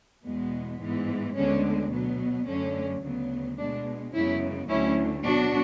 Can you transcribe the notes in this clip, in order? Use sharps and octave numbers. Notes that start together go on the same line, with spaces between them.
E2 B2 G#3 B3
G#2 E3 G#3 B3
D2 D3 G#3 B3 C#4
B2 F#3 B3
F#2 D3 A3 C#4
D2 C#3 F#3 B3
B2 G#3 B3 D4
F#2 C#3 G#3 B3 C#4 E4
D2 D3 F#3 A3 C#4 E4
B2 F#3 B3 D4 F#4